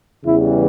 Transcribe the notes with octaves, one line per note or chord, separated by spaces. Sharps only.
E2 C#3 E3 G3 E4